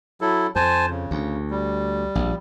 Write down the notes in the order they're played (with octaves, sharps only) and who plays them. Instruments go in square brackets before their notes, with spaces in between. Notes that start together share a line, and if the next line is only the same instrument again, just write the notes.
[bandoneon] F#3 E4 A4
[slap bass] F2 [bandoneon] C5 G#5 A5
[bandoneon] C#3
[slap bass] D2
[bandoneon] G3
[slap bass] A#1